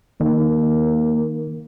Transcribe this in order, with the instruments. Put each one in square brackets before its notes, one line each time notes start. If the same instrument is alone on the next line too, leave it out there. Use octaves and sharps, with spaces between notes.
[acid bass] D#3 [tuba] A#3